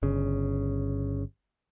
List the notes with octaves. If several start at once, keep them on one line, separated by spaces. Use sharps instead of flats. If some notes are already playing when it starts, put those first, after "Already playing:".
G1 C#3